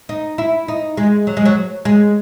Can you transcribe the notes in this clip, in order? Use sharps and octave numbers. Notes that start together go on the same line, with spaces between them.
D#4
E4
D#4
G#3
F#3
G#3
F#3
G#3